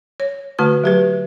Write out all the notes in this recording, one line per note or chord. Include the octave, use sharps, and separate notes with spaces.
C#5
D3 A3 F#4 B4 A5
F#3 G4 B4